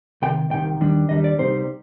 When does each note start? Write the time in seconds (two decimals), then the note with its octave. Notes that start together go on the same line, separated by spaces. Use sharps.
0.22 C2 C3 D#3 G5
0.51 C2 C3 D#3 G5
0.80 D#2 D#3 G3 D4
1.09 D#2 D#3 G3 D4 D#5
1.24 D5
1.39 C2 C3 G3 C4 D#4 C5